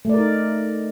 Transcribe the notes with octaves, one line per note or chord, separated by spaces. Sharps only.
A3 D#4 A#4 D5